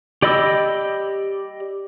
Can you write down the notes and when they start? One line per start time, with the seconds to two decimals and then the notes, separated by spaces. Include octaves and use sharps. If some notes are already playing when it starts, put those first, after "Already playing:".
0.22 G4 D5 D#5 B5 E6